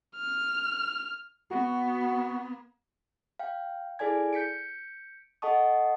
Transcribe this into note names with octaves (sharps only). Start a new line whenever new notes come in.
F6
B3 F#4
F5 G5
E4 G#4 A4 D5 G#5 G#6
G6 B6 C#7 D7
A4 D#5 F#5 A5 C#6 D#6